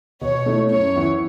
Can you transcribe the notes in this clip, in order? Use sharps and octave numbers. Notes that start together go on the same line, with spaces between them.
B2 C#5
A3 E4
F#2 C#5
E3 B3 E4